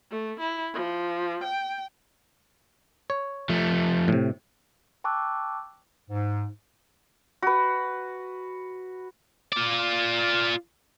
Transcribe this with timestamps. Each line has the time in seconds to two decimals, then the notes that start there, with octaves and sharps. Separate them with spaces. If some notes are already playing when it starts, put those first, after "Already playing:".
0.11 A3
0.40 E4
0.73 F3
1.43 G5
3.10 C#5
3.49 F3 A3
4.08 A2 C3
5.04 G5 A5 C#6 D6 E6 F#6
6.10 G#2
7.42 F#4 B4
9.52 F4 D5